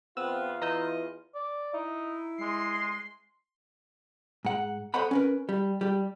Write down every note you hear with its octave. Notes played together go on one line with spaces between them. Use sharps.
E2 B3 C4 F4 E6
E3 D#5 A#5 E6 G6
D5
D#4 E4
G#3 C6
G#2 F#5
A4 C5 C#5 D#5 F#5 B5
C#4 A#4 B4
G3
G3 G4